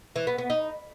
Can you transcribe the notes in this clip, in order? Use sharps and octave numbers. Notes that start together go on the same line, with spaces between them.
E3
B3
B3
D#4